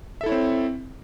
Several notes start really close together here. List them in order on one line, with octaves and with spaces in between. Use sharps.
E5 A4 E4 C#5 C4